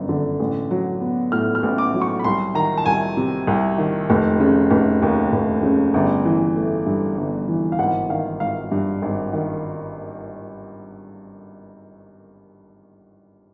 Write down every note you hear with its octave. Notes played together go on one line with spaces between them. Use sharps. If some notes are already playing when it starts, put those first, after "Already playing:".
Already playing: G1 F#2
D3
A1
F#3
B3
A2 F6
F6
A1
D6
F#3
C#6
B5
C2 C6
D#3 A#5
A5
C2 G#5
C3
C2
D#3
F1
C#3
F1
D#2
F1
C#3
G1
E3
A3
G2
G1
E3
F5
G#1 F#5
D#3 F5
G#1 F5
G2
G#1
D#3